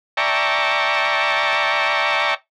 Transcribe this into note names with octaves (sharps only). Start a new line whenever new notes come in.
D5 E5 G5 A5 A#5 C#6